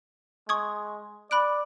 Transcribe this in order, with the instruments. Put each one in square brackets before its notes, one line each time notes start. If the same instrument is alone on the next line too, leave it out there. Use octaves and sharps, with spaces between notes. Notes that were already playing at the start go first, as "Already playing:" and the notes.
[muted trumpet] G#3 [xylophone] C#6 D#6 G#6
[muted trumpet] D5 [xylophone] B5 F#6 D7